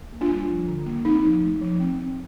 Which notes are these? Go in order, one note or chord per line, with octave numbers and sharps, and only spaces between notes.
A#3
D4 F4
G3
F3
D3
A#3
C4 D#4
F3
A3
F3
C4
C4